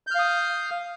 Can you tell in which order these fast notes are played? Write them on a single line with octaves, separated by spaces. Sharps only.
G6 F6 F5 D#6